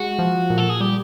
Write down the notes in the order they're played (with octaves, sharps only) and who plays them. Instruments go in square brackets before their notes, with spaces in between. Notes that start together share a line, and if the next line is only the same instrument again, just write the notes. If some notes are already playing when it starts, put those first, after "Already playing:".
Already playing: [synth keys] G#3 [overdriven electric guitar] F#4
[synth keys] F3
A#2
[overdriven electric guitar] A4
G#4
[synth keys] G3 [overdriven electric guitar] G4